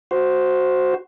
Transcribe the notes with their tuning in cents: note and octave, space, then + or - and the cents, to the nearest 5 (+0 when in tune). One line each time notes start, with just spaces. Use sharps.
F#4 +0 C5 +0